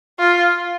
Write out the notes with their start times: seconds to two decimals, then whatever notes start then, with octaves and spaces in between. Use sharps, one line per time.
0.19 F4